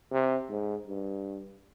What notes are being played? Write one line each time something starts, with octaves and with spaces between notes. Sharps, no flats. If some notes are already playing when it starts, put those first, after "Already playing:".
C3
G#2
G2